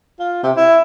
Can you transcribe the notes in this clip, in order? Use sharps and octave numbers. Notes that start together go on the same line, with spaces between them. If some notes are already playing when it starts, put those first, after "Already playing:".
F4
C3
E4